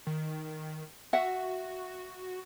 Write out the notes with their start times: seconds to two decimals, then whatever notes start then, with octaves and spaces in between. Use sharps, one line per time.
0.07 D#3
1.13 F#4 E5 F#5